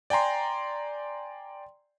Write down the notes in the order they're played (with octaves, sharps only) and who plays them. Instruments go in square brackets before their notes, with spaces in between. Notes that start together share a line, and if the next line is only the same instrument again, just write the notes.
[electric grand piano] D5 G5 G#5 A#5 C6